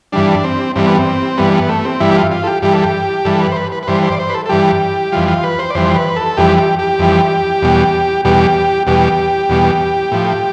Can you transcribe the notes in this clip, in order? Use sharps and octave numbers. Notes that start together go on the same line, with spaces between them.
G2 E3 G3 D4
C4
G2 E3 G3 C4
B3
C4
G2 E3 G3 B3
B3
A3
C4
G2 E3 G3 E4
G4
F4
F4
A4
G4
G2 E3 G3 G4
A4
G4
G2 E3 G3 A4
B4
C5
B4
B4
B4
G2 E3 G3 C5
C5
D5
C5
B4
A4
A4
G2 E3 G3 G4
F2 E3 G3 F4
F4
B4
C5
D5
F2 E3 G3 C5
B4
A4
F2 E3 G3 G4
G4
G4
F2 E3 G3
E2 B2 G3
E2 B2 G3 G4
E2 B2 G3 G4
E2 B2 G3
A2 F3